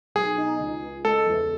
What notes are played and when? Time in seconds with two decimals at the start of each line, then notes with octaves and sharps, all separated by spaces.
0.15 B1 G#4
0.38 D#4
0.60 C#2
0.82 C#2
1.05 G#3 A4
1.27 E2